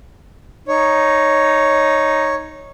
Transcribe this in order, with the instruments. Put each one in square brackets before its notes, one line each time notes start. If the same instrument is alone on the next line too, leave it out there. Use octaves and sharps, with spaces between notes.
[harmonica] D#4 [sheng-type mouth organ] C#5